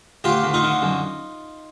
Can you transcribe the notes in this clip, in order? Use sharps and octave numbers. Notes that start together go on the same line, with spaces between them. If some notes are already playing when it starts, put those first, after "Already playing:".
D2 F4 G4
D2
D#4 F4
D3
F#2